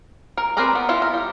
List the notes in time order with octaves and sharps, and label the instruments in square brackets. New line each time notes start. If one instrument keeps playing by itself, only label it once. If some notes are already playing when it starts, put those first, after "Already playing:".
[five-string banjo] A#4
C4 A#4 B4 D5 A#5
B3
E4 F4 E5
A#4
G3